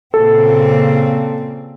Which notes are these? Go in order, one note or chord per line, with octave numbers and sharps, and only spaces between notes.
A#2 C#3 C4 A4